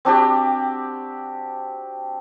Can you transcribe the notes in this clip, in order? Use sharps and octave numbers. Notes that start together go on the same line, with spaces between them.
C4 D4 F#4 G4